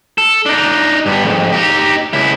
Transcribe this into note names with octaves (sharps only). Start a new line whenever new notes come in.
A4
D4 D#4
G2 B3
F2 G#2
D#4 G4
C#2 E4